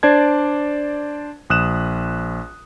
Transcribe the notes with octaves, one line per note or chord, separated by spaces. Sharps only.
D4 C5 D5 A5 G#6
A#1 D#6 F#6 E7